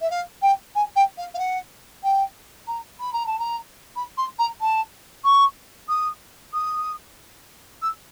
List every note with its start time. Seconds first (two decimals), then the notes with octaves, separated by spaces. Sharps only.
0.01 E5
0.10 F5
0.42 G5
0.75 G#5
0.96 G5
1.17 F5
1.34 F5
1.39 F#5
2.03 G5
2.67 A#5
3.00 B5
3.13 A#5
3.26 A5
3.39 A#5
3.96 B5
4.17 C6
4.39 A#5
4.61 A5
5.24 C#6
5.89 D#6
6.53 D#6
7.82 E6